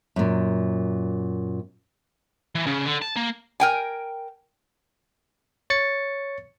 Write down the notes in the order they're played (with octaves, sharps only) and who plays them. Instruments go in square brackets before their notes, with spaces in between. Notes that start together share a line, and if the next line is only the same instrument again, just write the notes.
[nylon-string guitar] F#2 A#2
[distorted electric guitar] E3
C#3
D3
A5
A#3
[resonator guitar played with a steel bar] A#4 G5 G#5
[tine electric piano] C#5 A6 C#7